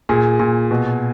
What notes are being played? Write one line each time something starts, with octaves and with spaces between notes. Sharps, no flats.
A#2 G#4
A#2
B2